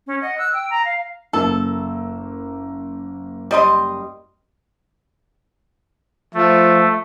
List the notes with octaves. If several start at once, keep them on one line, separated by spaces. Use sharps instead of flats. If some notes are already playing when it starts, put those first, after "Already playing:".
C#4
D#5 F#5
E6 F#6
G5 E6
A#5
F5
F#1 A#3 A4 E6
G3 D#5 C6
F3 A3